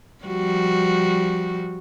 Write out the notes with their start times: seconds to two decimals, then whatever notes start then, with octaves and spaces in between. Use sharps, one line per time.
0.24 F3 G3 F#4